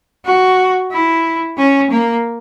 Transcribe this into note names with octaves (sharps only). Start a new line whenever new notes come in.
F#4
E4
C#4
A#3